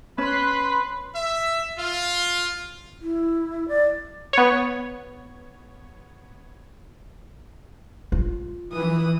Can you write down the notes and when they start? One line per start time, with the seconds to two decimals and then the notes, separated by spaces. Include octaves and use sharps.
0.18 C#4 B4 C6 F#6 B6
1.15 E5
1.78 F4
3.02 E4
3.68 D5
4.33 B3 C#5
8.12 F4
8.73 E3 B4 D#6